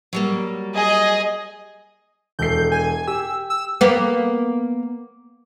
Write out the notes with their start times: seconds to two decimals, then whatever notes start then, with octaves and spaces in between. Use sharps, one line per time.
0.13 F#3 G3 A#3
0.74 G#4 D#5
2.39 E1 A4 G6 C7
2.72 G#5
3.08 G4 E6
3.50 E6
3.81 A#3 B3